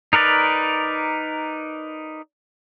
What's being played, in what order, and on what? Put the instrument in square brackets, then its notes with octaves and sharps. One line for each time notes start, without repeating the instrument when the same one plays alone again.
[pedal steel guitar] D#4 A#4 B4 D5